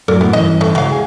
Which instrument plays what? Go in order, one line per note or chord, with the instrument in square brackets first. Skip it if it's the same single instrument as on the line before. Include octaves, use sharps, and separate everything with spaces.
[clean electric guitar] F#2 A2 F#3 [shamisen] A4 A#4 D5
[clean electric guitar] A2 [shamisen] B3
[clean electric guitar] G2 E3 C#4 [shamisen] D#5
[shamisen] F3 A3
[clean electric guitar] C#2 [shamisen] F#3 F5
[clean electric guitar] G#4 G#5